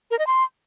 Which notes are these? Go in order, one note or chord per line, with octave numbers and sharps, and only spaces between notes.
A#4
D#5
C6